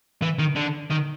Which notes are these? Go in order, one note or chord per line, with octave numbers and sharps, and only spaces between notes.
E3
D#3
D3
D#3